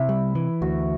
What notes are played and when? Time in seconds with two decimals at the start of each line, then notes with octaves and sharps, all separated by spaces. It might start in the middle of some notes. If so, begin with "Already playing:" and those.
Already playing: C3 E4
0.09 G3
0.35 E3
0.62 D2 F#4